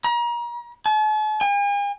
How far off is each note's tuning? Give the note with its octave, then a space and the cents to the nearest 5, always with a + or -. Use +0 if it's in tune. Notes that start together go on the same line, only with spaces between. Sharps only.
A#5 +35
A5 -45
G#5 -45